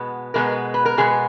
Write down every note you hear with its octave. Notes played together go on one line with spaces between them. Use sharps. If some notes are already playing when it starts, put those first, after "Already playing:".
Already playing: B2 G#3 B3
B2 G#3 B3 A#4
B4
A#4
B2 G#3 B3 G#4